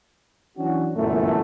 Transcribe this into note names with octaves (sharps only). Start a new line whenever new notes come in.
E3 F#3 C#4 D4 F#4
G1 F#2 A#2 E3 A3